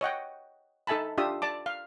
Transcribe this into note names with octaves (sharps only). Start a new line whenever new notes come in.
C#5 D#5 F#5 G5
D#4 A4 E5 G#5 A5 B5
D4 F4 G4 E5 D#6
D5 A5 D6
F5